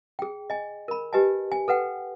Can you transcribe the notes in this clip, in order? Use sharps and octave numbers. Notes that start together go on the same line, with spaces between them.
G#4 G5
D#5 G#5
A#4 B5
G4 B4 D#5 G#5 A5
G#5
A4 B4 F#5 G5